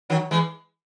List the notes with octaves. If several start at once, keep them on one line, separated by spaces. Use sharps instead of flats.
D#3 F#3
E3 G#3